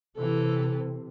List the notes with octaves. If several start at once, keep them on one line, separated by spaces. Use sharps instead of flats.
C3 E3 A4